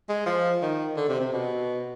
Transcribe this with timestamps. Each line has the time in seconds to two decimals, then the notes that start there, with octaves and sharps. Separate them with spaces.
0.09 G#3
0.26 F3
0.62 D#3
0.97 D3
1.09 C3
1.20 C3
1.32 B2